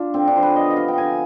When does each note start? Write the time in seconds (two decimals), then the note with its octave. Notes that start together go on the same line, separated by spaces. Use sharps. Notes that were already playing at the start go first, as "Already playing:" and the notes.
Already playing: D4 F4
0.14 D3 C4
0.28 D4
0.35 F3 C5
0.43 B4
0.56 B3 D#5
0.71 D#5
0.77 C3 F5
0.88 G5
0.98 D3 G#5